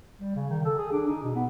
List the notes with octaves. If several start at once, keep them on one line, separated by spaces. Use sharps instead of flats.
G3
C#3
D#3
A4
G#4
D4
D#4
B2
B3